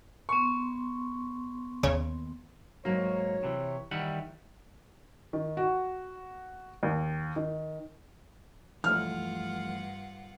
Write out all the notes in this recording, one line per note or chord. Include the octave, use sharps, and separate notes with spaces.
B3 C6 C#6
D#2 C#3 C#5
G#2 F#3 A#3 F#4 C#5
C3 E3
D#3 E3 G3 F#5
D#3
F#4
D#2
D#3
G2 E3 F3 A3 F4 F#5 F6